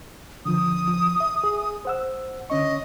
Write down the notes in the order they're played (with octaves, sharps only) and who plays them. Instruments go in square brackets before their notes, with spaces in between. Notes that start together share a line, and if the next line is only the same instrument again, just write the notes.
[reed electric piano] D3 F3 [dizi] D#6
[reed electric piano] F3
E5
G#4
C5 F#5 E6
[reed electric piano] D3 C#4 C#6 [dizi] D#5